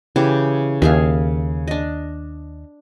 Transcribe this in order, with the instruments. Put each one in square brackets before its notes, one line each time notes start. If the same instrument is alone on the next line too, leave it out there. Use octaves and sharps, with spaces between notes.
[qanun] C#3 E3 G4
[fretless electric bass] D#2 [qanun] G#4 E5 F5
[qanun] D4 D#5